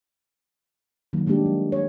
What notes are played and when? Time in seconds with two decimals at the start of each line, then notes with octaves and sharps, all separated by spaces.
1.13 D#3 F#3 A#3
1.27 G3 G#3 A#3 D4 G4
1.46 F#3
1.72 C#5